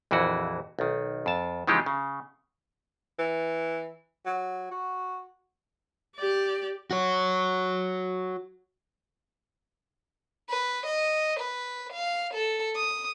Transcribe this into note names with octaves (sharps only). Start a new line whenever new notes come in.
A#1 F2 E3 E4 F#4
B1 D#3
F2 A5
C#3 E3 F3 G#3 D#4 G4
C#3
E3
F#3
F#4
G4 D5
F#4 C#5
B4
D#5
B4
F5
A4
D#6